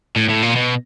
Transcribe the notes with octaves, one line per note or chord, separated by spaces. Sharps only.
A2
A2
A#2
B2